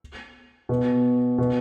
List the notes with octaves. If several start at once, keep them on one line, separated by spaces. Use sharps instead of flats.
B2
B2